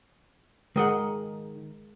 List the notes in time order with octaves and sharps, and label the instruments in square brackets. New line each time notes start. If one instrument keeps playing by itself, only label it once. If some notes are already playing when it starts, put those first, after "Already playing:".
[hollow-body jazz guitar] D#3 D#5 F#5 [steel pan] G#3 A#4